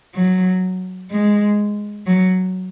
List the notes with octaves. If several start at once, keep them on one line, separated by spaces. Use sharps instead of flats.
F#3
G#3
F#3